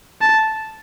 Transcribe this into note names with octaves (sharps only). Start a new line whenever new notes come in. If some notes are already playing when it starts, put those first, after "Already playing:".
A5